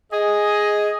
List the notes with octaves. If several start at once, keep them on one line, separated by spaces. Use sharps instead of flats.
G#4 D#5